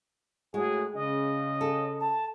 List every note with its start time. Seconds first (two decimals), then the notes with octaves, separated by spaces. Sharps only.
0.54 A2 G#3 F#4 G#4
0.95 C#3 D#5
1.61 A4
2.00 A5